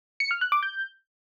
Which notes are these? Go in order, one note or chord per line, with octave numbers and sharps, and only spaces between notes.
C#7
F6
F#6
D6
G6